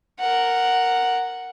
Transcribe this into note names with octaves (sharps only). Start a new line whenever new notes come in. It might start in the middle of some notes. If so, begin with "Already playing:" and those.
A#4 F#5